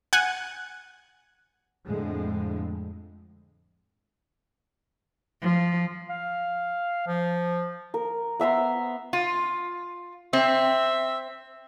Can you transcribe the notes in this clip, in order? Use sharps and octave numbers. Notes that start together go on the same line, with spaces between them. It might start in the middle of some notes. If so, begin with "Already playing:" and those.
F#5 G#5 F#6
F2 A2 D3 G#3
F3
F5
F3
A#4
B3 E5 A#5 C6
F4
C4 E5